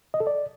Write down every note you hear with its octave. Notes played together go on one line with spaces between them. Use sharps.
D#5
A4
D5